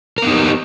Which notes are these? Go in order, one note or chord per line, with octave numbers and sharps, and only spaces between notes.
B3 D#4 G4 A#4